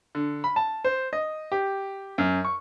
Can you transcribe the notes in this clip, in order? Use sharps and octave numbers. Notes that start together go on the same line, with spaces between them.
D3
B5
A5
C5
D#5
G4
F#2
C#6